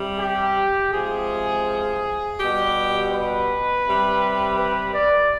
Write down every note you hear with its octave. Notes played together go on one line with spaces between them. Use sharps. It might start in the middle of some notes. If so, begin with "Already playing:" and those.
Already playing: C3 G3
G4
C3 F3 G#3 G#4
B2 G3 G4
B4
C3 G3
B4
D5